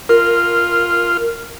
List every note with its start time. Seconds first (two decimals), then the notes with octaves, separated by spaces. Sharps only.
0.09 F4 A#4